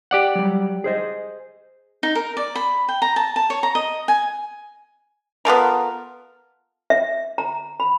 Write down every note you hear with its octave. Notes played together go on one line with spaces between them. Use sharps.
G4 D5 F#5
F#3 G3
G#4 C5 D#5
D#4
A#4
D5
B5
G5
A#5
A5
A5
C#5
A#5
D#5
G#5
B3 F4 A4 A#4
E5
A#5
B5